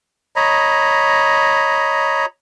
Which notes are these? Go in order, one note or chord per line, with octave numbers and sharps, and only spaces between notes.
C#5 D#5 A#5 B5